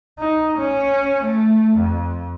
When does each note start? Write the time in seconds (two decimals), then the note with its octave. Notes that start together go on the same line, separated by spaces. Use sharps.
0.19 D#4
0.58 C#4
1.24 A3
1.77 F2